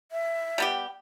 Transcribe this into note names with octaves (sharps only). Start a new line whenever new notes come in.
E5
G3 B3 G4